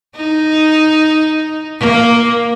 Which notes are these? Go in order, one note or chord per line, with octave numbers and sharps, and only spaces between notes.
D#4
A#3